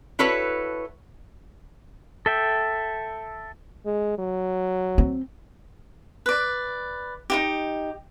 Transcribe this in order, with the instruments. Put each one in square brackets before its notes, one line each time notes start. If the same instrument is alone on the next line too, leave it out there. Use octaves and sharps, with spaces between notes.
[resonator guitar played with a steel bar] E4 F#4 A4 B4 C#5
[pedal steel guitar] A4 E5 G5
[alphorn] G#3
F#3
[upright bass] C4
[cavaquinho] B4 D5
D#4 E4 G4